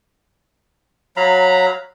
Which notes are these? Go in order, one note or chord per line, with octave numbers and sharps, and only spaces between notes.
F#3 F5 A#5 B5